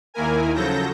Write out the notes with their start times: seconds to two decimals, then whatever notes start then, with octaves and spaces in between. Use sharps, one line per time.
0.14 D#2 D#3 A#3 E4 A#4 G#5
0.54 C#3 F3 F#3 A4 G6 A#6